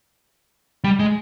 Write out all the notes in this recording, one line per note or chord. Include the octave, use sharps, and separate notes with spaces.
G3
G#3